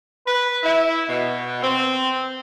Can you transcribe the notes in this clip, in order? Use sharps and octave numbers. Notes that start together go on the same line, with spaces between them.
B4
E4
B2
C4